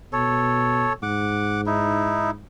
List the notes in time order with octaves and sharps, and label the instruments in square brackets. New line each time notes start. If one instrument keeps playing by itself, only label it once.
[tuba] B2 [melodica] A4 C#5
[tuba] G#2 [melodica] F#5 D6
[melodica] D#4 E4